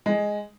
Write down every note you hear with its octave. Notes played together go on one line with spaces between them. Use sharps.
G#3